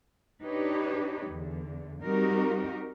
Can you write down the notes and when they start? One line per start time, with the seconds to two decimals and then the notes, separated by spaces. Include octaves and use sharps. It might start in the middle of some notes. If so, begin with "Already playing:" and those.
0.43 D4 D#4 G4 B4 C#5
1.29 E2 D3
2.04 G3 C4 D#4 F#4 G4 A#4